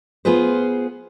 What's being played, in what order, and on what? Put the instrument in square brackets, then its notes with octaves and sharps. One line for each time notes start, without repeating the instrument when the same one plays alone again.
[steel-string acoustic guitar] B3 F4 G#4 B4 C5